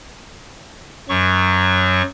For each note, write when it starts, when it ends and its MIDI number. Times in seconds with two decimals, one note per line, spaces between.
1.09 2.02 42
1.09 2.02 54
1.09 2.02 85